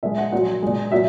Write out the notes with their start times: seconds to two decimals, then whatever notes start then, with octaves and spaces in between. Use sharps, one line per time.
0.03 A#2 G#3 E5
0.18 F#5
0.32 A#2 F#3 F#5
0.62 A#2 G#3
0.92 A#2 F#3 E5